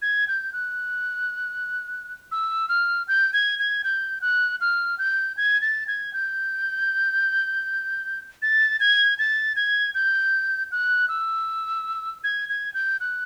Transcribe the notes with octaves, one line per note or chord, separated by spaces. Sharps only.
G#6
G6
F#6
E6
F6
G6
G#6
G#6
G6
F#6
F6
G6
G#6
A6
G#6
G6
A6
G#6
A6
G#6
G6
F#6
E6
G#6
G#6
G6
F#6